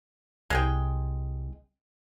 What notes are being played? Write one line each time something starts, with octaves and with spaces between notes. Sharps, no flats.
C2 G#3 G#4 G5